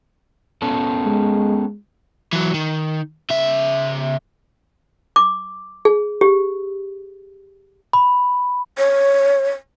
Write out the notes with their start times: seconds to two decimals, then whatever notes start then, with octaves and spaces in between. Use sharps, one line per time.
0.62 B3 C#4 A4
1.06 G#3
2.32 E3 F#3
2.54 D#3
3.30 C#3 E5
5.16 D6
5.85 G#4
6.21 G4
7.93 B5
8.77 C#5